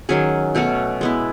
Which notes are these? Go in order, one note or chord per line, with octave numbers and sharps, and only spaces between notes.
D#3 F#3 C#4 G#4
B2 A3 C#4 F#4
G#3 B3 E4